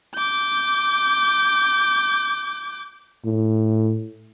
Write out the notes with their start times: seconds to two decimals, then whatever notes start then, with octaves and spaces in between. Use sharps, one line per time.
0.14 D6 G6
3.25 A2